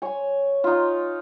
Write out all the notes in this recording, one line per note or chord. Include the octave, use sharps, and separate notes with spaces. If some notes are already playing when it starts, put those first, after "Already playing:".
C#5 G#5
D#4 F4